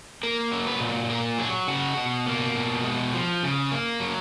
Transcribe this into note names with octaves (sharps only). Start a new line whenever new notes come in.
A#3 A#4
F#3
B4
A#2
A#3 A#4
F#3 G#4
C#3 F#4
B2
A#3
B2
G#3
F3
C#3
A#3
F#3